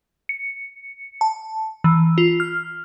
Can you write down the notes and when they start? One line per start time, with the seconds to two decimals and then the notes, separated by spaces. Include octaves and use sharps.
0.29 C#7
1.21 A5
1.84 E3
2.18 F4
2.40 F6